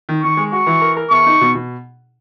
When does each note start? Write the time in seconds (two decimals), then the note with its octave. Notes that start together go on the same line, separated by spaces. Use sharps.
0.09 D#3
0.23 D#3 C#6
0.37 G#3
0.52 F#4 C#6
0.67 E3
0.82 A#4
0.97 A#4
1.11 E2 C#6
1.27 D#4
1.41 B2
1.55 B2